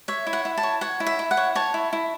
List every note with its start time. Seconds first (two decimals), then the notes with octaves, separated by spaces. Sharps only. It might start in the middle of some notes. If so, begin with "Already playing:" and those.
0.08 C#5 E5
0.27 E4
0.33 F#5
0.45 E4
0.58 A5
0.63 C#5
0.81 C#5 F#5
1.00 E4
1.06 E5
1.19 E4
1.31 F#5
1.37 C#5
1.55 C#5 A5
1.74 E4
1.93 E4